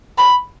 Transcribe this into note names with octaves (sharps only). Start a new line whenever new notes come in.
B5